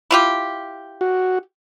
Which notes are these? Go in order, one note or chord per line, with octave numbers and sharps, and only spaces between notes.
E4 F4 G4
F#4